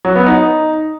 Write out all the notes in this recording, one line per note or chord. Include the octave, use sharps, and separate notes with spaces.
F#3
B3
D#4